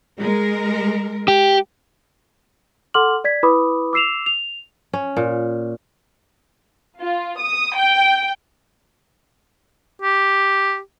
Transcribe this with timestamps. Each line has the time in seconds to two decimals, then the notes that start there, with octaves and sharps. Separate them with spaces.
0.19 G#3 A#4
1.28 G4
2.94 A4 F#5 C6 D6 F6 F#7
3.24 D5 G#6 B6
3.43 E4 B4 B5 D6 D#6
3.93 D6 E6 C7 E7 F7
4.26 F7
4.93 C#4
5.17 A#2
7.00 F4
7.39 D#6
7.77 G5
10.02 G4